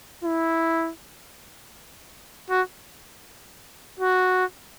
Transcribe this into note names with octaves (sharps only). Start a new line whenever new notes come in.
E4
F#4
F#4